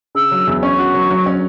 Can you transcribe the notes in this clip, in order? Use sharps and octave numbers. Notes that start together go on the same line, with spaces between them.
C#3 E6
F#3
E2
C#4 C#6
F#4
F#3
F#3
C#4